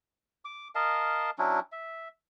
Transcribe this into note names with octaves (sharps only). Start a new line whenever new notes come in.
D6
A#4 D#5 F5 A5
F#3 C#4 D4 E4
E5